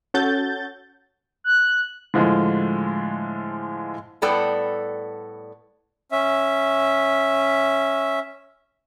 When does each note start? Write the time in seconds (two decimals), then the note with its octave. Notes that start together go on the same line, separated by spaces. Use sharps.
0.14 C#4 F#4 A4 G6 A6
1.44 F#6
2.14 A2 D3 F3 G#3
4.22 A2 G3 B3 A4 D5 G5
6.12 C#4 E5